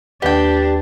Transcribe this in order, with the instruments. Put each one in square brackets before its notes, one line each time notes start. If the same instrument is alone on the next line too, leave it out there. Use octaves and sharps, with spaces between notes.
[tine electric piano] D#2 B4 D5 [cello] D4 [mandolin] G4 G5